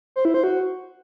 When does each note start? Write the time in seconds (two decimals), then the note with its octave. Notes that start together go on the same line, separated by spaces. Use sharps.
0.16 C5
0.25 E4
0.34 C5
0.44 F#4